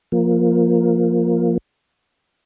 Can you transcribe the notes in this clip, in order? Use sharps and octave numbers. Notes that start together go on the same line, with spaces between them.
F3 A#3